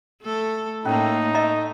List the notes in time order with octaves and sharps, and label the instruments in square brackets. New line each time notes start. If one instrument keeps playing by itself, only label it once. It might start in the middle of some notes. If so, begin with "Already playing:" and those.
[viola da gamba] A3 A4
[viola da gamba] A2 A#3 [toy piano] C#4 [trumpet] D#4
[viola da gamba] A3 [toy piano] D#5 A#5